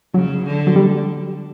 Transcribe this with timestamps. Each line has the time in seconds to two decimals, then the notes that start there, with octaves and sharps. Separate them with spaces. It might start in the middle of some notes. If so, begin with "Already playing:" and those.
0.14 C#3 F#3
0.45 D3
0.67 F#3
0.76 G3